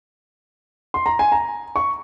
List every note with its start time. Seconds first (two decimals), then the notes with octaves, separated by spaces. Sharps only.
0.94 C6
1.06 A#5
1.19 G#5
1.32 A#5
1.76 C#6